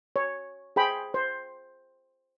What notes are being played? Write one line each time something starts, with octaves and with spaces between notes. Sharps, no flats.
C#5
G#4 C5 G5 B5
C5